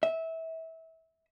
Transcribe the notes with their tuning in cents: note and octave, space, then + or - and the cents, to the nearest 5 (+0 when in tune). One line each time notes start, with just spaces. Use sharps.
E5 -25